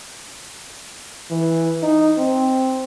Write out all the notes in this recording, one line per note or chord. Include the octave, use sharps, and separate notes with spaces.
E3
D#4
C4